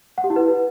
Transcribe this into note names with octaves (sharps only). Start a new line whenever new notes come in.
F#5
G4
E4
B4